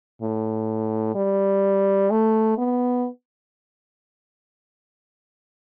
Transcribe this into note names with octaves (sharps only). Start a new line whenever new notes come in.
A2
G3
A3
B3